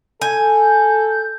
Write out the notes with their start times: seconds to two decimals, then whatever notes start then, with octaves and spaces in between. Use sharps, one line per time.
0.21 A4 G#5 G6